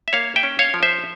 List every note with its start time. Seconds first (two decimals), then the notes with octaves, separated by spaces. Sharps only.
0.08 E5
0.13 A#3 C#5 F5
0.36 E5 G5
0.43 C#4
0.59 C#5 F5
0.74 F3
0.83 C5 E5